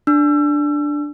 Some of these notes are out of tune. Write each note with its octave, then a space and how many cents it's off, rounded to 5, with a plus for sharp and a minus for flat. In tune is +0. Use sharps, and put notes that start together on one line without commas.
D4 +0 E6 +35